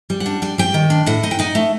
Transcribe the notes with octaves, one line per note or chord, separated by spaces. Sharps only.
G3
F#5
D4
G3 G5
G3 G5
D#3
D4
A2 F#5
D#4
G5
D#4 F#5
A3